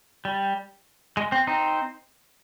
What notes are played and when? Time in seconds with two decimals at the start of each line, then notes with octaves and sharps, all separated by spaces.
0.25 G3
1.17 G#3
1.32 C4
1.47 C4 D#4